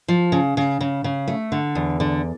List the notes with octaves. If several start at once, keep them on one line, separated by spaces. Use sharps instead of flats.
F3
C#3
C#3
C#3
C#3
A3
D3
E2
D3